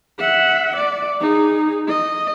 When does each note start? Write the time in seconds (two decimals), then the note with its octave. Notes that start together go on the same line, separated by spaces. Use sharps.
0.20 E5 F#5
0.77 D5
1.21 D#4 G#4
1.89 D#5